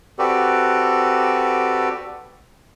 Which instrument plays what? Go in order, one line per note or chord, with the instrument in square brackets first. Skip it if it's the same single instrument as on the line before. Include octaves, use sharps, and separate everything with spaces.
[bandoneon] C4 F#4 G4 A4 B4 D5